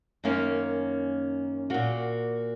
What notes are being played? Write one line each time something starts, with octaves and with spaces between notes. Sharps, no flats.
F#2 D#3 A#3 C#4
A#2 A#3 F#4